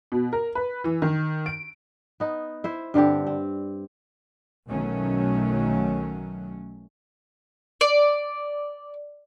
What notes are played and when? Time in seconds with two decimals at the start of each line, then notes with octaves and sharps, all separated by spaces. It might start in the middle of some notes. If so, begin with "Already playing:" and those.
0.12 B2
0.33 A#4
0.55 B4
0.84 E3
1.02 D#3
1.46 D7
2.20 B3 D#4
2.64 E4 C5 E5
2.94 G2 D3 C4 G4
3.27 C4
4.68 B1 B2 D#3 F#3 A3 C#4
7.81 D5